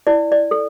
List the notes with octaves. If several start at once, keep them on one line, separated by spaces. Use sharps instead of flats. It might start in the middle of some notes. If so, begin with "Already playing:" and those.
E4 D5
D5
A4